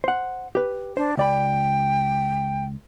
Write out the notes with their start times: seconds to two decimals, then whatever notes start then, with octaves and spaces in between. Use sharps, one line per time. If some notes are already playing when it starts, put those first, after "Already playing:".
0.04 C5 F#5
0.55 G4 B4
0.97 D4 C5
1.17 C#2 D5 G5 B5